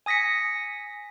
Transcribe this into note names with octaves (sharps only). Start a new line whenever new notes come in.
G#5 D#6 A#6 B6 C#7